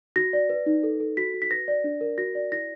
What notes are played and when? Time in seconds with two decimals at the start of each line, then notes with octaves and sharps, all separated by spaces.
0.16 F#4 A#6
0.33 D5
0.49 B4
0.66 D#4
0.83 A4
1.00 A4
1.17 F#4 B6
1.34 F#4
1.42 B6
1.51 B4 A#6
1.68 D5
1.84 D4
2.01 A#4
2.18 F#4 A#6
2.35 D5
2.52 E4 A#6